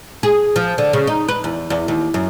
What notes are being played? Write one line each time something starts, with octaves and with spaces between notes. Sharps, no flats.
G#4
F3
D3
C#3
D#4
B4
E2
E2
D#2
F#2